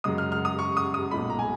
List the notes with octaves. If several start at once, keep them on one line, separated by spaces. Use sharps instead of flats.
F#2 C#3 G#3 D#6
F6
F6
D#6
C#6
D#6
D#6
B1 A#2 G#3 B5
A#5
G#5